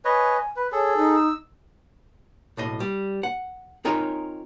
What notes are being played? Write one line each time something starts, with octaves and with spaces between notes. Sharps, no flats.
B4 C#5 D#5 G#5
B4
G#4 A4 C#5
D#4
E6
B1 A2 D#5
G3
F#5
C4 D#4 F4 A#4 C#5 G#5